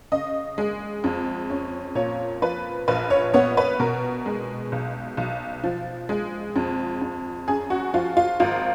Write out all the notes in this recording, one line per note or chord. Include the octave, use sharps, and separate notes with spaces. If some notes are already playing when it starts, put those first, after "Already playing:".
C#3 D#5
G#3
F2
C#4
A#2 C#5
F3 B4
A#1 B4
C#5
B3 C#5
B4
B2 A#4
G#3
B1
B1
F3
G#3
F2
F2
F#2 G#4
F#4
F3 F4
F4
G#1 F4